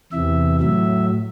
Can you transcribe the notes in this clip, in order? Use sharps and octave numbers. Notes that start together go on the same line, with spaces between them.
E2 C3 E3 E5
A2 F#3 E5